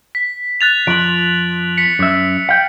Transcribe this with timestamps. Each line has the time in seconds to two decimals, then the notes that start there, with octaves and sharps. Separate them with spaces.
0.15 B6
0.61 F#6 A6 F7
0.87 F2 F3 D7 F#7
1.77 B6 C#7
1.99 F#2 E5
2.49 F5 G5